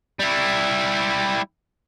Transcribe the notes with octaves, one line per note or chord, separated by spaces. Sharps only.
G3 E4